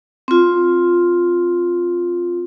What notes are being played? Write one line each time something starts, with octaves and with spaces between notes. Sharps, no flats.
C4 F4